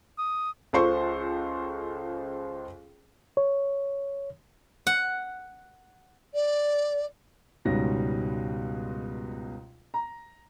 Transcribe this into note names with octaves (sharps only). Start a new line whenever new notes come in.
D#6
C#2 F4 A4 C5 C6 C#6
C#5
F#5
D5
C#2 G#2 B2 G3 C#4 A#6
A#5